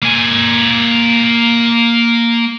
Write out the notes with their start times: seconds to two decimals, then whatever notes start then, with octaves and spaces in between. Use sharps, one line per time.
0.03 A#3 G#5